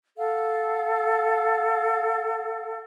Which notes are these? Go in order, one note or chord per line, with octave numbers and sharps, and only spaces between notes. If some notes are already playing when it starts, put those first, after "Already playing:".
A4 F5 F#5